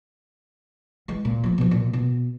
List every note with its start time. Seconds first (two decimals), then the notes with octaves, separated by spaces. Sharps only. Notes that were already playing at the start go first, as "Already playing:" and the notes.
1.08 E3 G#3
1.25 A#2
1.44 F3 A3
1.58 B2 F3
1.71 A#2
1.93 B2